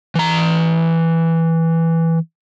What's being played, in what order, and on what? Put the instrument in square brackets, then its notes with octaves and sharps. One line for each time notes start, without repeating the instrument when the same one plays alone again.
[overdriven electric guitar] E3 A#5